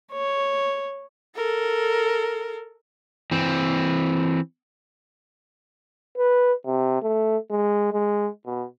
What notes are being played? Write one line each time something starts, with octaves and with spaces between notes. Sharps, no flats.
C#5
A4 A#4
E3 C4
B4
C3
A3
G#3
G#3
B2